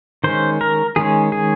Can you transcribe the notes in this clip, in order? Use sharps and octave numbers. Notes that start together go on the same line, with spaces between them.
D#3 G#3 C#4 C5
A#4
D#3 G#3 C#4 G#4
G#4